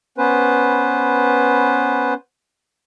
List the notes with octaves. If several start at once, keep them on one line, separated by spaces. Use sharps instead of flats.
B3 C#4 B4 C5